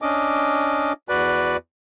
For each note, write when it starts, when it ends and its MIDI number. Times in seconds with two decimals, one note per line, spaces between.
0.02 0.93 61
0.02 0.93 62
0.02 0.93 75
0.02 0.93 86
1.09 1.57 40
1.09 1.57 66
1.09 1.57 71
1.09 1.57 74
1.09 1.57 90